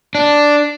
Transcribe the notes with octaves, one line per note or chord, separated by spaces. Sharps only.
D4